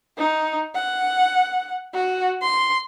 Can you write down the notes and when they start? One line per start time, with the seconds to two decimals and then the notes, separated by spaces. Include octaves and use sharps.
0.17 D#4
0.75 F#5
1.94 F#4
2.42 C6